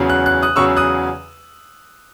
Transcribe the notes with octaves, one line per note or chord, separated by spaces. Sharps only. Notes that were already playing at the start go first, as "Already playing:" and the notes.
Already playing: E2 C#3 F#3
F#6
F#6
D#6 F#6
E2 C#3 F#3 C#6 E6
D#6 F#6